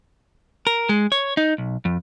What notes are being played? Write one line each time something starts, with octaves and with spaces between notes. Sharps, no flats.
A#4
G#3
C#5
D#4
B1
F2